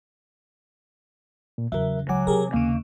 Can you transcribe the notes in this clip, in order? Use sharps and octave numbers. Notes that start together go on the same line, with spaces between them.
A#2
E2 C#3 F#3 A#4 E5
C#2 F#3 F#5 G#5 D6
C3 G4 G#4 A#4
D#2 C#3 A#3